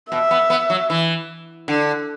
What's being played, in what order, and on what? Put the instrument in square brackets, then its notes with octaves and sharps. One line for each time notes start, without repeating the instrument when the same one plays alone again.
[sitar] B2 [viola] E5
[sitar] B3
B3
F#3
E3
D3